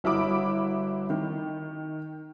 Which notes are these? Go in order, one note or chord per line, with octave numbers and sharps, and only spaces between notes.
G1 E4 F#4 B5 D6
D#3